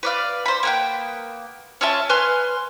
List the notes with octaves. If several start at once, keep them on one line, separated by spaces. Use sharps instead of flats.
B4 D5 F5
C5 B5
A#3 B3 G5
C#4 F4 E5 A5
B4 G#5 C6 F6